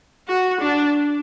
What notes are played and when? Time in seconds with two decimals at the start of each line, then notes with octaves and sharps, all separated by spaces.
0.28 F#4
0.61 D4